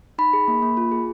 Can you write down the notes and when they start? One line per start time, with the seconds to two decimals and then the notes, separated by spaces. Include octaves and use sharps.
0.18 D#4 B5
0.33 G#4
0.48 A#3
0.62 A#3
0.77 F4
0.92 G#4